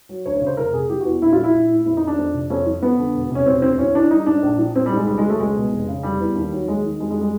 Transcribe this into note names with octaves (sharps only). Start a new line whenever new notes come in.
F#3
D2 C#5
C#5
C#3
C5
F1 A#4
C3 G#4
F3 G4
F#4
E2
A#1 E4
F4
F3
E4
A#1
A2
F2 E4
D#4
D#3
D4
F2
C3
F2 C#4
F3
F2 B3
D3
E1
C3 C#4
E1 C4
D2 C4
A1 C#4
E3 D4
G3 D#4
G#2 D4
A#1
F3
A#1 C4
G3
G#2
G#3
C#2 G3
G#3
F#3
A3
C#2 G#3
B2
F1
C#3
F1 G3
E2
D#2
F#3
D#2 G#3
D#3
F2 G#3
G#3
G3
G#3